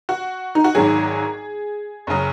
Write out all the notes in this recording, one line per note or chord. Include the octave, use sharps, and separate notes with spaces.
F#4
D#4
F#4
G#1 G#2 D#3 F#3 G#4
F#1 C#3 F#3